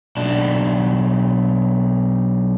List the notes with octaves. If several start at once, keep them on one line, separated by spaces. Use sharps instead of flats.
B1 D4